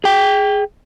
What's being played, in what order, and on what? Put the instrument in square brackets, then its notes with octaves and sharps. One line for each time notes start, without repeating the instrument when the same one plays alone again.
[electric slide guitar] G#4 G5